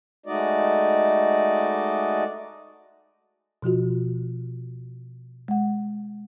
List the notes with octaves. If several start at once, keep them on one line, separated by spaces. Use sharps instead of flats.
G#3 A3 D#4 F#4 D5 D#5
B2 F3 F4 F#4
G#3 F#5